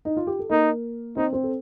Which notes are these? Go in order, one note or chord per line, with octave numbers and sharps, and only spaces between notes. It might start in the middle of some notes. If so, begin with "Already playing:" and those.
D#4
F4
G4
A4
A#3 D#4 A#4
C4 D#4 C5
C4 C5
A4